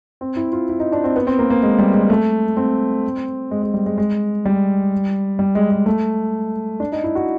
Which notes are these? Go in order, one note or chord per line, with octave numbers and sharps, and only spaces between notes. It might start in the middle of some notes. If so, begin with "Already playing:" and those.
C4
E4
F4
E4
D#4
D4
C4
B3
C4
A#3
A#3
G#3
G3
G#3
A3
C4
G#3
G#3
G3
G#3
G#3
G3
G3
G#3
G#3
A3
D4
D#4
E4
F#4